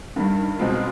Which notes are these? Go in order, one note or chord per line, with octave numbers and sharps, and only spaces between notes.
G2 D#3 G3
C#2 B2 G#3 C4 F4